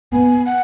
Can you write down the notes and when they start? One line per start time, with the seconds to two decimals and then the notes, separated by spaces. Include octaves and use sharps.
0.12 B3 G#5
0.46 F#5